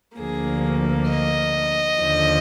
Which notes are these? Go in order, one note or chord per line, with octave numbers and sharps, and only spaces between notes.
D2 D3 F3 A#3 G#4
D#5
D#2 D3 F3